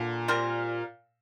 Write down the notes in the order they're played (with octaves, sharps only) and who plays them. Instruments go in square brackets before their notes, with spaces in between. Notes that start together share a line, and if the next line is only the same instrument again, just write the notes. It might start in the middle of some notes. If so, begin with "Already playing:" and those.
Already playing: [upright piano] A#2 [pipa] D3
[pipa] G3 C4 F4 A#4